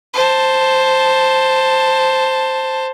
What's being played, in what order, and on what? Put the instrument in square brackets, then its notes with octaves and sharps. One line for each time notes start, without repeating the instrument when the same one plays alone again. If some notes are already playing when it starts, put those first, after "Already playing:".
[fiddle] C5 A5